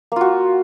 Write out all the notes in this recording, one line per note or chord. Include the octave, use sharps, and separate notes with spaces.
A#3 F4 F#4